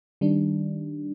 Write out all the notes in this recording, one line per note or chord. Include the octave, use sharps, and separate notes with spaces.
D#3 G3 D4